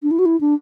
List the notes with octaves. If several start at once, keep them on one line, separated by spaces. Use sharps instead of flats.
D4
E4
F#4
E4
D4